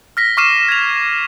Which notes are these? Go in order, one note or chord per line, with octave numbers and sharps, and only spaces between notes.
F6 A#6 B6
C#6 D6 F6 C7 D#7 E7
G#6 F7